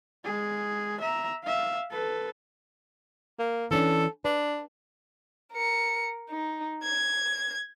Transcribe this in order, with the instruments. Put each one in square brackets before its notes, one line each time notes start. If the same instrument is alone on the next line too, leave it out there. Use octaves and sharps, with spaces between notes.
[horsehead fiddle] G#3 G#4
E5 A#5
E5 F5
A4 B4
[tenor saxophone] A#3
[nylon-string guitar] E3 C#4 D4 [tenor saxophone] A4
[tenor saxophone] D4 [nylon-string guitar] B4
[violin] A#4 C#7
D#4
G#6